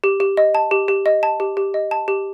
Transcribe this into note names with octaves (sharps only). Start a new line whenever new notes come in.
G4
G4
D#5
A5
G4
G4
D#5
A5
G4
G4
D#5
A5
G4